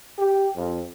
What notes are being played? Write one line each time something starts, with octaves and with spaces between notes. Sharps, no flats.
G4
F2